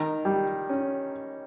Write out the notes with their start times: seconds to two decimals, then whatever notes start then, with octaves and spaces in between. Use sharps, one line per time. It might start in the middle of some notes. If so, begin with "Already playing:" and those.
Already playing: D#3 A#5
0.25 G3
0.70 C#4